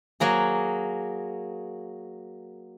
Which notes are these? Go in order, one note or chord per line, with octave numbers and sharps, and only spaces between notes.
F#3 A#3 G#4